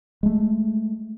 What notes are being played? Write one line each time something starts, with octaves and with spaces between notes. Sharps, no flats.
G#3 A3